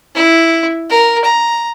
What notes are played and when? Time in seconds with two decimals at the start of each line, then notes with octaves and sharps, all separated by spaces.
0.15 E4
0.90 A#4
1.24 A#5